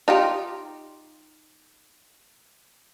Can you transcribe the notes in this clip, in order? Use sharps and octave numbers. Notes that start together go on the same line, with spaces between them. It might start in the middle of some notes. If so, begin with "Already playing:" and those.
D#4 F4 G4